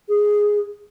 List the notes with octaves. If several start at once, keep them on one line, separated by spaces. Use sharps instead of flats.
G#4